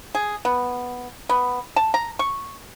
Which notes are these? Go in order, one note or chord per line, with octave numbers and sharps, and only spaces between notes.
G#4
B3
B3
A5
A#5
C#6